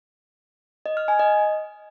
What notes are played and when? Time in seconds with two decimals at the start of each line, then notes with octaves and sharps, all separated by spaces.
0.86 D#5
0.97 F6
1.08 G#5
1.19 D#5